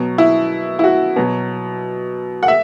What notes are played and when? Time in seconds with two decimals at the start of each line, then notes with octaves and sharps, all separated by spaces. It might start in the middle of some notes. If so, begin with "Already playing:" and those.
Already playing: B2 F#3
0.18 E4
0.79 E4
0.84 F#4
1.16 B2 F#3
2.43 F#5
2.48 E5